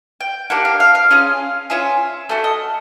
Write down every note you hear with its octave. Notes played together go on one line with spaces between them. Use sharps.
G5
A#3 D4 G4 F#5
F5
F5
F5
C#4 F4 G#4
C#4 F4 G#4 E5
A3 C#4 F#4 D5
D#5